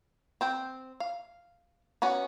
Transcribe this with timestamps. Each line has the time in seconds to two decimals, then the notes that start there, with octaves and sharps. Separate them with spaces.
0.41 C4 C5 G5
1.00 F5
2.02 B3 C#4 F#4